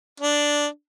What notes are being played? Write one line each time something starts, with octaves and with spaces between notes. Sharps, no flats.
D4